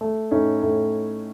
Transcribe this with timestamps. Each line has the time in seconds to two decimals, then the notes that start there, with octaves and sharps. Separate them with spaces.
0.01 A3
0.31 A2 C#4 D#4
0.63 A2